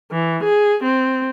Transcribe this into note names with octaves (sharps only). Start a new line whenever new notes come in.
E3
G#4
C4